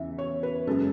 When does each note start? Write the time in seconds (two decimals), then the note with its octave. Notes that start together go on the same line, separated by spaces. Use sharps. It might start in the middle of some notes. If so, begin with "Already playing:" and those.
Already playing: E2 C#3 E3 E5
0.19 C#5
0.43 B4
0.67 F#2 C#3 G#3 A4